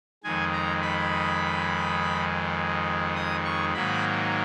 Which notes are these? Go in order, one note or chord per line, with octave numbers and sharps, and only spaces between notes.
F2 D#3 G#3 G#5
A#5
B5
D#6
C#6
G#2 D#3 F#3 A#3 B5